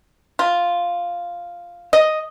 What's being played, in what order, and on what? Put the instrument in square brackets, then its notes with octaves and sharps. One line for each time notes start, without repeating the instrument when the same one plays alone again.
[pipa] F4
D#5